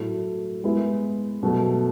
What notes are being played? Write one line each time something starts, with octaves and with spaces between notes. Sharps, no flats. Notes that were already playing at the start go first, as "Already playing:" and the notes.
Already playing: A2 F#3 A3 E4
G#3 B3 E4
B2 F#3 A3